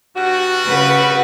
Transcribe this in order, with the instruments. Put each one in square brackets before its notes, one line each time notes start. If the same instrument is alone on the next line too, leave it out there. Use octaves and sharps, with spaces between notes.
[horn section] G2 F#4
[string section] C#3 B4 F#5